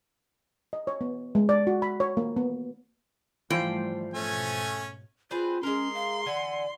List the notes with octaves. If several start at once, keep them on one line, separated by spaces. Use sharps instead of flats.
D#5
C#5
B3
G#3
D5
F#4
B5
C#5
A#3
B3
G#1 E3 F3 G3 A3 C5 G5
G#2 B2 A3 C#4 G#5
C4 F4 G#4 B4
G#3 C#4 A#4 C6
F5
D3 E3 F#5 G#5